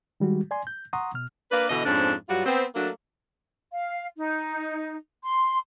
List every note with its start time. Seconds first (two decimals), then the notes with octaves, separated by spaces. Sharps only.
0.20 D#3 G3 G#3 F#4
0.51 D5 G#5 C6
0.67 G6
0.93 F#5 A#5 C6 C#6 D#6
1.14 B2 F6
1.51 A#3 D4 B4
1.69 B2 D3 E3 D#5
1.85 F2 G#2 F3 C#4 D4
2.29 G2 F#3 G3 F4 F#4
2.46 B3 C4
2.75 F#3 A3 A#3 D4
3.72 F5
4.18 D#4
5.23 C6